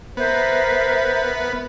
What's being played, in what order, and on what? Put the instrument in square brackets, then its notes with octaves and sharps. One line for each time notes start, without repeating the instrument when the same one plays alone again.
[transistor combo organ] B3 [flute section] A#4 E5 [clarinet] C5